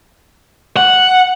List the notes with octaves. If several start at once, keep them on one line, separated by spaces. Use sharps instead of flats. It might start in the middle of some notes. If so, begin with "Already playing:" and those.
F#5